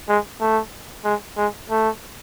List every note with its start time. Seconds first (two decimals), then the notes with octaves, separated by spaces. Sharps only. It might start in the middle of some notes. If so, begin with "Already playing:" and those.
0.09 G#3
0.40 A3
1.04 G#3
1.37 G#3
1.70 A3